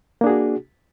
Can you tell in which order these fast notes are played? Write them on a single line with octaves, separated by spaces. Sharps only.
A#3 D4 G#4 F#4